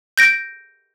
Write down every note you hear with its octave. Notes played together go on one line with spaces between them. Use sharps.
G6 A#6 D7